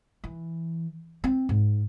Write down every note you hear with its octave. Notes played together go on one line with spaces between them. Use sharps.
E3
C4
G#2